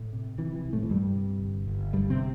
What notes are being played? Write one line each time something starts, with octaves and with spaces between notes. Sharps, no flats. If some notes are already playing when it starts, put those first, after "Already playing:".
Already playing: A2 A3
C3
C3 E3
E3
C2
A2 A3
E3
C2 G2 G3
C3
G1
G1
G2 D3 G3
C3 C4